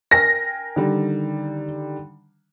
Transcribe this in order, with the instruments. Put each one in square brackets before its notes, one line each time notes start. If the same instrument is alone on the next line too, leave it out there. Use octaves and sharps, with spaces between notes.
[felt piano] A#4 G5 G#5 [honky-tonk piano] A#6
[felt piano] D3 D#3 G3